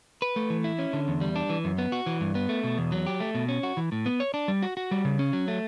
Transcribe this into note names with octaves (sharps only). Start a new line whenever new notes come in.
B4
A3
E3
E4
C#4
D3
E2
G3
D4
E3
F#2
B3
F#4
E3
G2
B3
A3
B2
E2
F#3
G4
A3
B2
C#4
F#4
E3
A2
B3
C#5
D4
G3
F#4
F#4
G3
C#3
C#4
F#3
A3